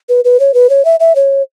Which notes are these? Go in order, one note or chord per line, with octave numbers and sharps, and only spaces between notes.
B4
B4
C#5
B4
C#5
E5
E5
C#5